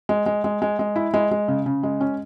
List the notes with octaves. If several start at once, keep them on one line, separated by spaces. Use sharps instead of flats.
G#3
G#3
G#3
G#3
G#3
E4
G#3
G#3
C#3
C#3
G#3
C#4